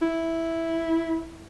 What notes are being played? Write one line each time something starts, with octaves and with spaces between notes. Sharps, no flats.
E4